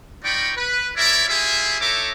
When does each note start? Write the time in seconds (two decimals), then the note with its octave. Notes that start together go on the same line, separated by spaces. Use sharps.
0.24 D#4 F4 D5 G5 B5 C#6
0.57 B4
0.96 E4 A#4 C#5 D5 E5
1.28 E4 F4 G4 G#4 E5
1.80 D#4 E4 A4 C#5 E5 D6